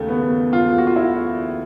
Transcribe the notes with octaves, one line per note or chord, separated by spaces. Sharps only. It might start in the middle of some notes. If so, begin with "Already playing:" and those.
Already playing: D#2 C#3 A3
B3
F4
F#4
F4
E4